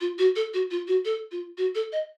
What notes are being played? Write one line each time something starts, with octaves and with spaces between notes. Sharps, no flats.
F4
F#4
A4
F#4
F4
F#4
A4
F4
F#4
A4
D#5